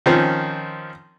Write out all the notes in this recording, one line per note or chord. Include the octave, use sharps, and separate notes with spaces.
D#3 F3 C4 C#4